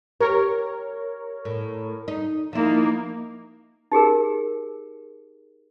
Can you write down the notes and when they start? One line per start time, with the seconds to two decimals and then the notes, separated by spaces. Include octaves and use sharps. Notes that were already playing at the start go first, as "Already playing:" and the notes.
0.20 G4 A#4 C#5
1.45 A2
2.08 D#4
2.53 F3 A#3 D#4 E4
3.92 D#4 G4 G#4 A#4